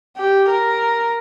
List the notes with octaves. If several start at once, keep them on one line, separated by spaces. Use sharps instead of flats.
G4
A#4